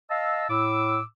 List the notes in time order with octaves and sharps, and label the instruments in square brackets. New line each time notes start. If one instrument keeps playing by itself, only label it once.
[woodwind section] D#5 F5 A5 E6
A2 D6 E6